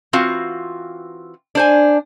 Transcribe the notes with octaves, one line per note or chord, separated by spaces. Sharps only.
E3 C4 F4 F#4 F5
D4 C5 G#5